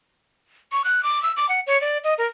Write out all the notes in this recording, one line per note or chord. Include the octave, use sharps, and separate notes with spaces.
C#6
F#6
D6
E6
D6
F#5
C#5
D5
D#5
A#4